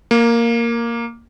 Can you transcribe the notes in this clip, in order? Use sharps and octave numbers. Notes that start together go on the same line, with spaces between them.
A#3